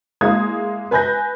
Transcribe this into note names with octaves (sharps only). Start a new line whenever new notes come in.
G#3 A#3 E4 D#6 G#6
B4 G#5 B5 F#6 G6 A#6